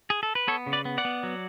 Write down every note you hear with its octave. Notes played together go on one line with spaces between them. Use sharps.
G#4
A4
B4
B3 A4 C#5
C#3
B4 D5
B3
D5 F#5
B3
F#3